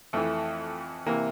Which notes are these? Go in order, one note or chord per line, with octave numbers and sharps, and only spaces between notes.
F2 E3 A3
C3 E3 A#3